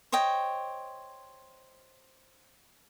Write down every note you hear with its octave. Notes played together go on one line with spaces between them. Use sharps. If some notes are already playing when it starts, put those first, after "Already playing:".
C5 C#5 D#5 G5